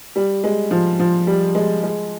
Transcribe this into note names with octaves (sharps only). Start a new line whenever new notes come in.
G3
G#3
F3
F3
G3
G#3
G#3